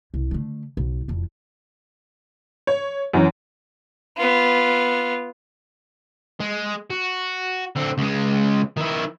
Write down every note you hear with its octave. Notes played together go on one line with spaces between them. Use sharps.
C2
D3 A3
B1
E1 F2
C#5
F#2 E3 C#4
B3 F4
G#3
F#4
D3 C4
C#2 G#3
D#3 E4